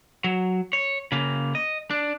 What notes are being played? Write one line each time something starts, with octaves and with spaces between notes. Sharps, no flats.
F#3
C#5
C#3 A#3
D#5
D4